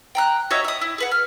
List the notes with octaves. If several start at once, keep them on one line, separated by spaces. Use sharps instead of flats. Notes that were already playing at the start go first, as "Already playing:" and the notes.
G5 A#5 F#6
F#4 C#5 D#5 E5
E5 D#6
E4
G#4 B4 F#5
F6